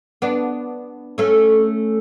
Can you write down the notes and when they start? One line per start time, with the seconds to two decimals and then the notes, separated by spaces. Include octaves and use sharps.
0.22 B3 D4
1.18 A3 C#4